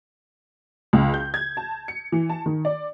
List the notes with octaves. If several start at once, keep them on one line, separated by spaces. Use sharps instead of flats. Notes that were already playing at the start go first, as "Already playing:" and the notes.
C#2
G6
G#6
A5
C#7
E3
A5
D#3
D5